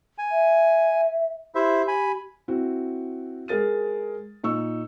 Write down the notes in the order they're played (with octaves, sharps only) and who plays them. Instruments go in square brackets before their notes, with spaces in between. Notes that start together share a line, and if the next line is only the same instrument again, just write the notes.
[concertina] G#5
[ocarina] E5
[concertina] E4 C5 E5 [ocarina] G4
[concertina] G#5 B5
[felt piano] C4 E4 F#4
G#3 G#4 A#4 A6 D#7
A#2 D#4 C#6 E6